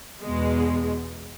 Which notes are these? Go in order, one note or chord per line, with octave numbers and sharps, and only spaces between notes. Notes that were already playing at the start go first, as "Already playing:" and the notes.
E2 B2 G#3